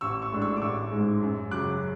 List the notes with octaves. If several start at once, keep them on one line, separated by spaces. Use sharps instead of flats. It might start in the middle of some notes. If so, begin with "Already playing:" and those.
A1 C#6 E6
C#6 E6
A2 G#3 D4
C#6 E6
D6
A1 C#6 E6
G#2 G#3
F#2
C#3 F#3 D6 F#6